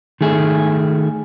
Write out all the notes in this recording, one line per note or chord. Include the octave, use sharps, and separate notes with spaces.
D#3 A3 G#4